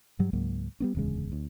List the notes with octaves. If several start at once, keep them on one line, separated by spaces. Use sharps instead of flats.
G2 F#3 G3
C#2 G#2 F#3 A#3
G3 B3 C#4
D1 E2 C#3 G#3
D2